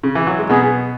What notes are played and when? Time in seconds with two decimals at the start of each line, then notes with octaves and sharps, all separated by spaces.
0.03 C#3
0.15 E3
0.27 F#3
0.39 G#3
0.49 B2 B3 G#4